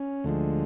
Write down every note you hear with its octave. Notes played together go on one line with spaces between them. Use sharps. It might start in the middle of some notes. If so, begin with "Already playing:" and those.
Already playing: C#4
D2 D3 F3 G#3